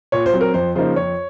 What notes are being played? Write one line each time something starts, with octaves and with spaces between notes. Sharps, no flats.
A#2 C#5
C5
F#3 C4
A#4
F2 C5
C#3 F3 A#3 D#4 C5
F2 C#5